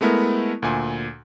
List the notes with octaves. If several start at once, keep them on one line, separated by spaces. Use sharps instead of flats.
G#3 A3 B3 E4 A#4
D2 A#2 G#5